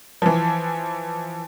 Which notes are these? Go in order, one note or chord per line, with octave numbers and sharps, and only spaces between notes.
E3 F3